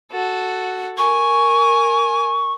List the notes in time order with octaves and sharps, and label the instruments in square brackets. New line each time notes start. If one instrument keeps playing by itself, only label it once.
[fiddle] F#4 A4
[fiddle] A#4 G#5 [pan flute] C#6